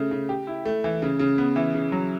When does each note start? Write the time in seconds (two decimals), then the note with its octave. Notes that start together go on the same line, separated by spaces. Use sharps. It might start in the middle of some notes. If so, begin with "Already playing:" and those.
Already playing: C#3 A3
0.11 C#3
0.29 G4
0.47 E4
0.65 A3
0.84 E3
1.02 C#3
1.19 C#3
1.38 B3
1.56 E3
1.74 C#3
1.92 F#3